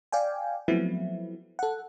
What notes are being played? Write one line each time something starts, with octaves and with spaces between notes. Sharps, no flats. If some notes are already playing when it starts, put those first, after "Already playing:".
D5 F5 G5 G#5
F3 F#3 A3 B3 C4 E4
A4 F#5